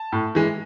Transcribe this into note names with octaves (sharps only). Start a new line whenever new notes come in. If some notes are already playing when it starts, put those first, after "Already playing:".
Already playing: A5
A2
E3 G#3